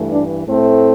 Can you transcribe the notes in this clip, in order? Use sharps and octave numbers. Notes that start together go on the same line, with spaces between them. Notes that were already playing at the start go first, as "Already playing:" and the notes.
Already playing: G2 E3 A3
D4
A2 A3 C4